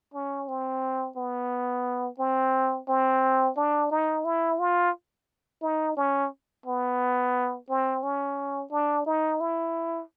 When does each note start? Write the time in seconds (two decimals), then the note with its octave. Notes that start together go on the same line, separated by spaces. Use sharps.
0.14 C#4
0.48 C4
1.16 B3
2.19 C4
2.88 C4
3.57 D4
3.91 D#4
4.25 E4
4.59 F4
5.62 D#4
5.97 C#4
6.66 B3
7.69 C4
8.03 C#4
8.71 D4
9.06 D#4
9.40 E4